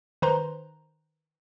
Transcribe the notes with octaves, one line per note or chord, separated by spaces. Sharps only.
D#3 B4 C5 A#5 C6